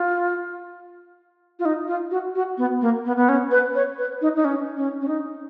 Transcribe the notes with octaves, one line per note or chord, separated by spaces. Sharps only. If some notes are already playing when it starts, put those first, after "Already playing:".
Already playing: F4
F4
D#4
F4
F#4
F#4
B3
A#3
B3
B3
C#4
B4
C#5
B4
D#4
D#4
C#4
C#4
C#4
D#4